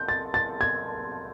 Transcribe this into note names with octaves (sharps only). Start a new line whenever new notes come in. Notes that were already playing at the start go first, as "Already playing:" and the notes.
Already playing: G6
A6
A6
G#6